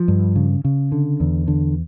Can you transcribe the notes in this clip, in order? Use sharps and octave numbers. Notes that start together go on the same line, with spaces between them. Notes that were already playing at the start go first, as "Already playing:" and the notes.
Already playing: F3
G2
C#3
C#3
D3
E2
D3